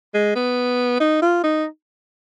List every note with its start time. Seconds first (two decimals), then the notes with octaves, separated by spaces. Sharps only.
0.14 G#3
0.36 B3
1.00 D#4
1.22 F4
1.44 D#4